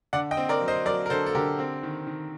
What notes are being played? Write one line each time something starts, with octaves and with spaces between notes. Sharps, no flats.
D3 D5 F#5
D#5 G5
C4
A#4 D5
F#3
C5 D#5
F#3 A#4 D5
A#4
D3 A4 C5
A4
D3 G4 A#4
C4
D#3
D#3